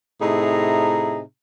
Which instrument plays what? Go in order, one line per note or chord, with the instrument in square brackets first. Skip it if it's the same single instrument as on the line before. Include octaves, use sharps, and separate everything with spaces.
[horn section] A2 C3 D#4 G#4 E5 A#5